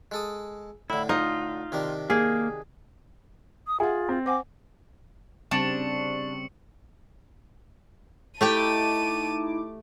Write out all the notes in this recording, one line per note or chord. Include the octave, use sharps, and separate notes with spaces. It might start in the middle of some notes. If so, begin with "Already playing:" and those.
G#3 A4 D#6
A2 D3 E4
D#4 F4
C3 D#3 D4
A#3 G#4
D#6
F4 G#4 E5 F#5
C4
C5 F#5 G#5 D6
C#3 G3 C4 D4 C#6 C#7 F#7
A3 D#4 E4 G4 G5 A5 D6 D#7